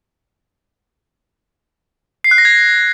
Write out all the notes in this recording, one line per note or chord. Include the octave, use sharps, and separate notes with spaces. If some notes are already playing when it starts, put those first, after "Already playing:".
C7
F#6
A#6
G#6